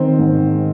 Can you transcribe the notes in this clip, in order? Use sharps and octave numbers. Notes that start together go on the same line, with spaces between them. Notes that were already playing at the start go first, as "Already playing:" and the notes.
Already playing: D#3 C4
G#2